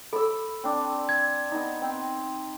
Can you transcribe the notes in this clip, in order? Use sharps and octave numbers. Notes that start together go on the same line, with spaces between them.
A4 B5 E6
C4 D4
G#6
B3 D#4
C4